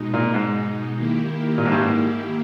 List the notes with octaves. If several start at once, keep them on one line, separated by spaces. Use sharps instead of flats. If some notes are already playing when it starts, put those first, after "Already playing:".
Already playing: B2 G#3 D#4
A#2
G#2
D#3 A#3 E4 G4
A#2
G#2
G2
G#2